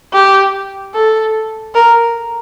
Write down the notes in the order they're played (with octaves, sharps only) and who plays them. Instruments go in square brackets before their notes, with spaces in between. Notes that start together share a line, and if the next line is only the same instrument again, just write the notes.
[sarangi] G4
A4
A#4